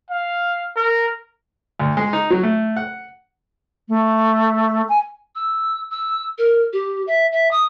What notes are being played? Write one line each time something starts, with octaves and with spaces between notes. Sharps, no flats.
F5
A#4
D2
G#3
D#4
F#3
A3
F#5
A3
G#5
E6
E6
A#4
G4
E5
E5
D#6